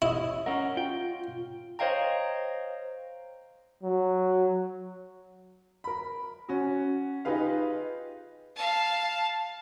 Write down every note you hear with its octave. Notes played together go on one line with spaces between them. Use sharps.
E4 C#5 D#5
C#4 A#4 F#5
F4 G5
C5 C#5 D#5 F5 G5 A#5
F#3
A#4 B5
C#4 F#4
D#4 F4 G4 G#4 B4 F5
F5 A5